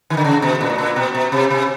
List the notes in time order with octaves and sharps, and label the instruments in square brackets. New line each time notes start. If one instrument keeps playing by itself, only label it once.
[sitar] D#3
D3
C#3
B2
A#2
A2
A#2
B2
B2
C3
C3